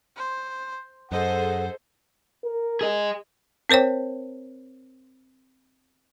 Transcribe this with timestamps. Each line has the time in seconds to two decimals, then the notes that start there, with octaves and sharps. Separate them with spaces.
0.16 C5
1.12 F#2 G#4 A4 C5 D#5 F#5
2.45 A#4
2.81 G#4 D#5
3.69 C4 A#4 C5 C#5 G5